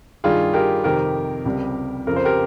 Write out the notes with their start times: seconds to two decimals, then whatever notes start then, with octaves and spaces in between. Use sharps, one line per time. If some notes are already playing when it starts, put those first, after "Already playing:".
0.24 G2 D#3 G3 F4 G#4
0.54 G4 A#4
0.84 F2 C3 D#3 G4 A#4
1.45 C#2 C3 G3
2.07 F2 C#3 F3 A#4
2.16 C5
2.25 G4 A#4